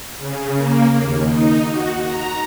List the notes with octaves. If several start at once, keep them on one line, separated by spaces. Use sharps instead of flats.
C#3
A#3
D#2
D#4
F#4
A#5